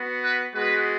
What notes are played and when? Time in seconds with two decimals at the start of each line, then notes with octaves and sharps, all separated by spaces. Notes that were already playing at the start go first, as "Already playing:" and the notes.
Already playing: B3 F#4
0.22 B4
0.55 G#3 B3 F#4 B4